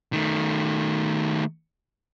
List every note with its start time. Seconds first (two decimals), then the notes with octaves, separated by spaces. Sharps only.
0.13 D#3 A3